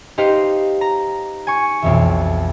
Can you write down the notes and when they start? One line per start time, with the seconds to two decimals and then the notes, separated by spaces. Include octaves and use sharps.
0.18 D#4 G4 B4 C5 D#5 F5
0.81 A#5
1.47 G#5 C#6
1.82 B1 F2 E3